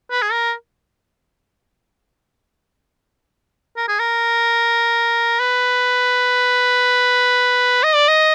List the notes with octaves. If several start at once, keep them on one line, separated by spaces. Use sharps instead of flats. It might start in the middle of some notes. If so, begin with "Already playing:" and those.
B4
G#4
A#4
A#4
G#4
A#4
B4
D#5
D5
D#5